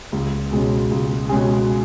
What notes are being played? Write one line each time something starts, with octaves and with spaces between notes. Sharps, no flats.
C#2
B2 G#3 C#4 G#4
C#2
B2 G#3 C#4 G#4